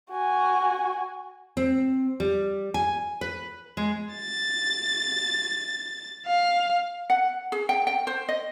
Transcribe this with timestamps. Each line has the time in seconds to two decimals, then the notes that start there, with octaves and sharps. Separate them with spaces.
0.11 F#4 G#5
1.57 C4
2.20 G3
2.74 G#5
3.21 B4
3.77 G#3
4.15 A6
6.26 F5
7.10 F#5
7.52 G#4
7.69 G5
7.87 G5
8.07 C5
8.28 D#5